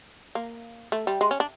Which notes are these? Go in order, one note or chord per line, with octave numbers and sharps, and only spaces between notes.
A#3
A3
G3
G#3
C#4
D4